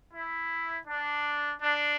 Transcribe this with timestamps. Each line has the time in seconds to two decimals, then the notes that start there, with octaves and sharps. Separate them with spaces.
0.14 E4
0.88 D4
1.62 D4